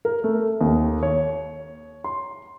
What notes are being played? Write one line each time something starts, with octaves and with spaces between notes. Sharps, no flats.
A#4
A3
D#2
C#5
C6